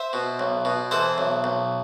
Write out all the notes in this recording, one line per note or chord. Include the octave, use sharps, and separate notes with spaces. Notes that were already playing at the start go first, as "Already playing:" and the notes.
Already playing: C5 E5
B2
B1
B2
E3 A4 C5
B1
B1